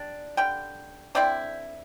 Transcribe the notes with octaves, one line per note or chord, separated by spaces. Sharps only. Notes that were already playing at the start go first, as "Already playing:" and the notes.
Already playing: G3 D4
D3 G3 G5
D3 C4 E4 D5 G5